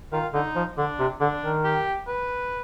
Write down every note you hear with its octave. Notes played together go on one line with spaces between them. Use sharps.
D#3 F4
D3 D#4
F3
D3 D4
C3
D3 D4
D#3
G4
B4